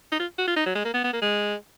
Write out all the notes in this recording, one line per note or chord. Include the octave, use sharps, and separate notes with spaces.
D#4
F4
F#4
F4
D#4
F#3
G#3
A#3
B3
B3
A#3
G#3